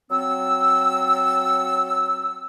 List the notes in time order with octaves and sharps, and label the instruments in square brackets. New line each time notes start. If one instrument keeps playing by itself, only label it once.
[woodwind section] F#3 C4 E6